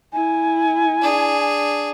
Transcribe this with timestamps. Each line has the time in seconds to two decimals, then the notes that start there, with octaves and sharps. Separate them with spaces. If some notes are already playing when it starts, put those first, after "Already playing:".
0.13 E4 G#5
1.01 D4 G#4